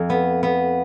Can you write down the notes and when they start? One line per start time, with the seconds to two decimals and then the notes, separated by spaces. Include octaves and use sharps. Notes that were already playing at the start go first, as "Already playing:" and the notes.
Already playing: F2
0.10 B3
0.43 B3